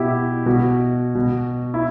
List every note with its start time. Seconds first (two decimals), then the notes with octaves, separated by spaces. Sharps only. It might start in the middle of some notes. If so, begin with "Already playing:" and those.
Already playing: B2 E4 G4
0.46 B2 F#4
1.15 B2
1.74 E4